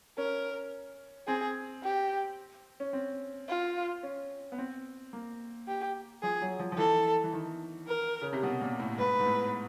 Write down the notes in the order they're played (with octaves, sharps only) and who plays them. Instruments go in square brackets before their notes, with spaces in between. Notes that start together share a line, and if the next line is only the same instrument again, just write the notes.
[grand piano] C#4 [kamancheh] A#4
[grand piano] C4 [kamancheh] G#4
[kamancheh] G4
[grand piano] C#4
C4
[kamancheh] F4
[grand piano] C#4
B3
C4
A#3
[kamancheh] G4
[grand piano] F3 [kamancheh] G#4
[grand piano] F#3
F3
F3
[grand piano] E3 [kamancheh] A4
[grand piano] E3
D#3
[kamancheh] A#4
[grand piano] C#3
C3
B2
A#2
A2
[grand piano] G#2 [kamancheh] B4
[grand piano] G#2
A2